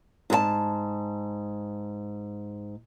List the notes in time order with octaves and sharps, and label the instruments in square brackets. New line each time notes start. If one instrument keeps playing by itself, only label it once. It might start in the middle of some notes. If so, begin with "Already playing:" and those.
[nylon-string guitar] G#2 G#4 A5